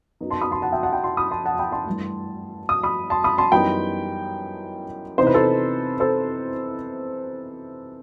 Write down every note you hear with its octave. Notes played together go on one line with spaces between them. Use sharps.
F#2 F#3 B3 D#4
A5 C6
B5 D#6
A5 C6
F#5 A5
E5 G5
F#5 A5
G5 B5
A5 C6
B5 D#6
A5 C6
F#5 A5
G5 B5
A5 C6
G2 E3 A3
D#6
B5 D#6
A5 C6
B5 D#6
A5 C6
F#2 E3 G3 B3 D#4 G5 B5
C3 E3 B3 D#4 C5
B4
A4 C5
A4 C5